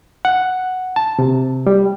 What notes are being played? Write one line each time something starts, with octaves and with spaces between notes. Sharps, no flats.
F#5
A5
C3
G3